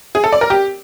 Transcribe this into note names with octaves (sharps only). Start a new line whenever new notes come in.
G#4
A4
D5
A#4
G4